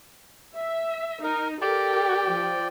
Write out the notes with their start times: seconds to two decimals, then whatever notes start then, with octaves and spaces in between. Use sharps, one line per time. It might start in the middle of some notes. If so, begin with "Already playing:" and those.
0.57 E5
1.24 D#4 A#4
1.62 G4 A4 A#4 D5 G5
2.27 F3